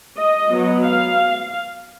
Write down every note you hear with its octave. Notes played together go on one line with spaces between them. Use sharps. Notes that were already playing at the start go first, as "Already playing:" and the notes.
D#5
F#3 B3
F5